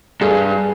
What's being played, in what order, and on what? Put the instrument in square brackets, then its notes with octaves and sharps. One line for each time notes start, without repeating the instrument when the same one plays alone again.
[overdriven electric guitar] G2 [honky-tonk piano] G#4